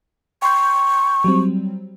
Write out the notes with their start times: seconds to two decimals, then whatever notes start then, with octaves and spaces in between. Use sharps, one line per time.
0.42 G5 C6 C#6 G6
1.24 F#3 G3 C4